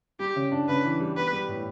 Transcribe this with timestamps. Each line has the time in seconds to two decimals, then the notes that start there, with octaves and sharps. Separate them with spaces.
0.20 G3 G4
0.36 C#3
0.52 D4
0.68 C#3 B4
0.84 E3
1.00 G3
1.16 B3 B4
1.32 G3
1.49 A2